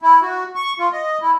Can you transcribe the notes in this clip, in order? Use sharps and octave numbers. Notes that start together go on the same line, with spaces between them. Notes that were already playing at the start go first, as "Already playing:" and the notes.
E4
F#4
C#6
F4
D#5
E4